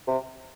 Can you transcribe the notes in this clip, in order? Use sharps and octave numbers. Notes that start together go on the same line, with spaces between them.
C3